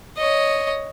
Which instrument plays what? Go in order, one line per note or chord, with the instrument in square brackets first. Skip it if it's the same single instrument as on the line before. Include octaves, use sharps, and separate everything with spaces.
[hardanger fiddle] C#5 D#5